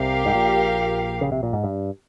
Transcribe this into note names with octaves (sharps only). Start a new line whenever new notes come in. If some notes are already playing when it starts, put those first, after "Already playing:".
Already playing: C2 C3 G4 A#4 F5
G#2
A#1 A#2
C#3
C3
A#2
G#2
G2